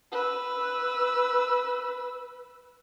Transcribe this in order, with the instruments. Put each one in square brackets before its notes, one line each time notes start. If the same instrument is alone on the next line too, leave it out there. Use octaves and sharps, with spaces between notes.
[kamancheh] B4 E6